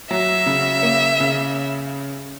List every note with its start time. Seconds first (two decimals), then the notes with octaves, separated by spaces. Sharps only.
0.11 F#3 E5
0.46 C#3
0.83 A#3
1.20 C#3